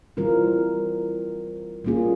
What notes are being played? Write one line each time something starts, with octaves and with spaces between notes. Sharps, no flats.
E3 G3 C4 F4 A#4
G3 A#3 C#4 F4 G#4